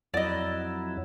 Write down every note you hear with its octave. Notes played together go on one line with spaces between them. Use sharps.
F2 F#3 E4 D5 D#5